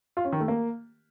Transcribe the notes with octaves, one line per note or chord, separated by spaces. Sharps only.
F4
C#4
D#3
A3
A#3